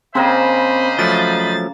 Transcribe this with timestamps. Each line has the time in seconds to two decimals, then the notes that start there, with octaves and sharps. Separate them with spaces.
0.15 C#3 A#3 C4 C5 D#5 A#5 B5
0.99 F3 F#3 A3 A6